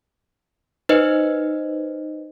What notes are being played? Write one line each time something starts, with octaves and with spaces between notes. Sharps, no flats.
D#4 B4 C5 D#5